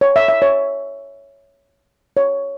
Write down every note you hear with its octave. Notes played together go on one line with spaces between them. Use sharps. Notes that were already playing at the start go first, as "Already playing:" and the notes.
C#5
E5
E5
C#5
C#5